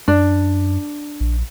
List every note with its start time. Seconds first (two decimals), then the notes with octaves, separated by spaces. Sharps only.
0.08 F#2 D4
1.20 A#1